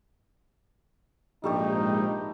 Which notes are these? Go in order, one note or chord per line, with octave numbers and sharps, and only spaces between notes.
A#1 G#2 G3 A3 D#4 G4